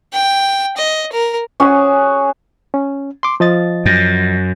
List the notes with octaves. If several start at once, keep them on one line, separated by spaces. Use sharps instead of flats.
G5
D#5
A#4
C#4 F#4 G#4
C#4
C6 D6
F3 D#5 A6
F#2